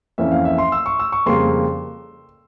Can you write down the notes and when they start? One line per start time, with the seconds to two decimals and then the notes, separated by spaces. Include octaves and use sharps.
0.18 F2 E3 A#3 C#4 E5
0.32 F5
0.45 E5
0.58 C6
0.72 E6
0.86 C#6
0.99 E6
1.12 C#6
1.26 F2 C#3 G3 A#3 C6